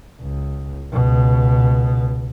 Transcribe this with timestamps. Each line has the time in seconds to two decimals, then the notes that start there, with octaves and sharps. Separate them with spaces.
0.21 C#2
0.92 C#2 B2